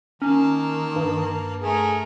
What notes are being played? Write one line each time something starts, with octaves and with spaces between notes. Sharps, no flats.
D#3 A#3 C#4 A5
G2
A3 G#4 A#4